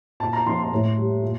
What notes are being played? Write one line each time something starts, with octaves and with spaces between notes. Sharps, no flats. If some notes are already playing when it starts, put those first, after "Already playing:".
A#2 A5
A#5
F3 C6
C6
A2
G3
A#2